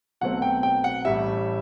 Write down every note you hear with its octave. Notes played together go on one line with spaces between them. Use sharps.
B1 B2 F#3 A3 C4 F#5
G5
G5
F#5
A1 A2 G3 E5